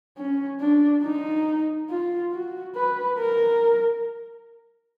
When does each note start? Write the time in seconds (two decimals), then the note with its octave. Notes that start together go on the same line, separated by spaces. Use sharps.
0.17 C#4
0.60 D4
1.03 D#4
1.89 F4
2.32 F#4
2.75 B4
3.18 A#4